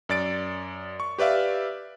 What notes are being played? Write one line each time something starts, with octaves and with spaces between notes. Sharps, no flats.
F#2 D5 A6 D7
C#6
G4 B4 D5 E5 F5